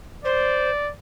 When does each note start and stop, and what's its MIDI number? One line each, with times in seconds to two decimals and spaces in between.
0.25 0.70 72
0.25 0.91 74